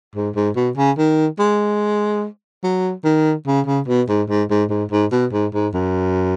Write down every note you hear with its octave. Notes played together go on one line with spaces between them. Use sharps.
G#2
G#2
B2
C#3
D#3
G#3
F#3
D#3
C#3
C#3
B2
G#2
G#2
G#2
G#2
G#2
B2
G#2
G#2
F#2